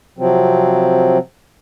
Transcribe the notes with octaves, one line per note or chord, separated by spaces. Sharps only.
C3 F3 F#3 C4